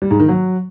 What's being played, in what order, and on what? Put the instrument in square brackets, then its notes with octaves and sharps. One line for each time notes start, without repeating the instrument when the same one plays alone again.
[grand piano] G3
G#2
D#3
F#3